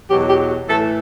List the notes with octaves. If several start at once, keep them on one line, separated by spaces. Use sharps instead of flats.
E2 B2 F#3 G4
G4
A2 E3 A4